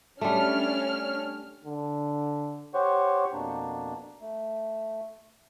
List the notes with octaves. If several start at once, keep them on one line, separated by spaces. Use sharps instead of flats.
G3 A3 C#4 D4 F6
D3
G4 C5 C#5 F#5 C#6
F2 B2 A#3 D4
A3